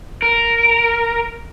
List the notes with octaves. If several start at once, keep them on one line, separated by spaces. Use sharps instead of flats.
A#4